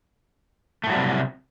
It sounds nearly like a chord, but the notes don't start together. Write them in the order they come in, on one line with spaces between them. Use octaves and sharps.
A3 A2 F#3 G3 C3